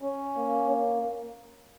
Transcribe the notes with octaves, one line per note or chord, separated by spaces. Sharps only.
C#4
A#3